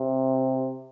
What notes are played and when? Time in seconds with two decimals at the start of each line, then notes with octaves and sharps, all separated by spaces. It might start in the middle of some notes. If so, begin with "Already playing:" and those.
Already playing: C3